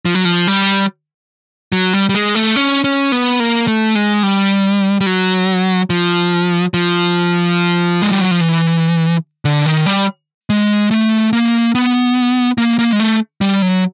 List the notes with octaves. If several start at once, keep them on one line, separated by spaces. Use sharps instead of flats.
F3
F#3
F3
G3
F#3
G3
G3
G#3
A3
C#4
C#4
B3
A#3
A3
G#3
G3
G3
F#3
F3
F3
G#3
G3
F#3
F3
E3
D3
D#3
G3
G#3
A3
A#3
B3
A#3
A#3
G#3
A3
G3
F#3